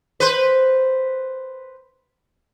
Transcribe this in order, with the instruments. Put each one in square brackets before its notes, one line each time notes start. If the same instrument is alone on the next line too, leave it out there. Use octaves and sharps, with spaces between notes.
[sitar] B4 C5